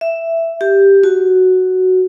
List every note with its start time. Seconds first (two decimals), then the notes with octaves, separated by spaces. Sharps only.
0.01 E5
0.61 G4
1.03 F#4